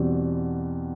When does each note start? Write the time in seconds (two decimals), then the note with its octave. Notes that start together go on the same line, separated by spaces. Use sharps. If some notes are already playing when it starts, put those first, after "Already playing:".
Already playing: E2 B2 G3 C4